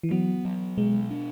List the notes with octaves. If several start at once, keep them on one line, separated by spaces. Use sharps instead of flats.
E3
F#3 B3
F#3
B2 G#3
D4